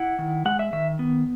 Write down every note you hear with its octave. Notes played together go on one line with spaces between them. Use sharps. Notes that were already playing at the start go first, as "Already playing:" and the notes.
Already playing: E4 F#5
D#3
G#3 F#5
E5
D#3 E5
B3